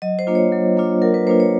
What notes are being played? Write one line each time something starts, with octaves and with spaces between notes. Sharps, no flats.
F#3 D#5
C5
A#3 D4 F4
C#5
F#3
A#3 D4 F4
F#3 A#4
B4
A#3 D4 F4 C5
C#5